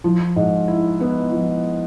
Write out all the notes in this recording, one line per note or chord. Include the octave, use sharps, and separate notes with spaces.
F3
G#2
E4
B3
F3